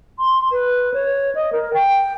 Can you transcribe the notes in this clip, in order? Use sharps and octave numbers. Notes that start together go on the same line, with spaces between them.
C6
B4
C#5
D#5
A#4
G5